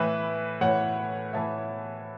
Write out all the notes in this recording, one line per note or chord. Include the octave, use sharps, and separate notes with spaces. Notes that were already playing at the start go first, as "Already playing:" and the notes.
Already playing: A2 E3 B4 E5
A2 E3 C#5 F#5
A2 E3 E5 A5